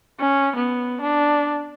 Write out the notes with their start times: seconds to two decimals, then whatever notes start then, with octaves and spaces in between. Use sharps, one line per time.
0.20 C#4
0.56 B3
1.01 D4